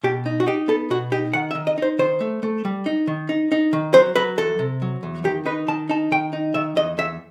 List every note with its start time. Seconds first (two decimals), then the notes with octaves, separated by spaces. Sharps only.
0.04 B2 G4
0.26 D#4
0.40 F#4
0.47 D#4 G4
0.68 B3 A4
0.90 B2 F#4
1.12 D#4 G4
1.33 D#3 F#5
1.51 E5
1.55 D#3
1.67 D#5
1.78 D#4 C5
1.99 D#3 C5
2.21 A3
2.43 A3
2.65 G3
2.86 D#4
3.07 D#3
3.29 D#4
3.52 D#4
3.73 D#3
3.94 F#3 C5
4.16 F#3 B4
4.37 E2 A4
4.59 C3
4.82 F#3
5.03 E2
5.24 D#3 G4
5.46 D#4 B4
5.68 D#3 A5
5.89 D#4 A5
6.11 D#3 G5
6.33 D#4
6.54 D#3 E5
6.76 E2 D#5
6.98 E2 E5